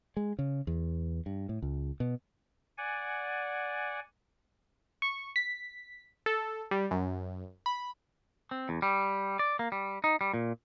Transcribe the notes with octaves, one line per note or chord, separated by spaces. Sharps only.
G#3
C#3
E2
G2
A2
C#2
B2
D5 F#5 G#5
C#6
B6
A4
G3
F#2
B5
C4
E2
G3
D5
A#3
G3
D#4
G3
A#2